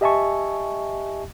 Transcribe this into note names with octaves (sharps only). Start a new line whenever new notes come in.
G4 D#5 E5 G#5 A5 C#6